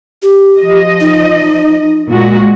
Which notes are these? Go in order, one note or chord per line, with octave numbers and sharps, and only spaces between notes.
G4
F3 D#5
D#4
A#2 G#3 F#4